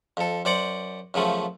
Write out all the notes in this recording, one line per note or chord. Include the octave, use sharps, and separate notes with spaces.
F2 A4
F#2 C5 D5 F#5
F#2 C#3 F3 A3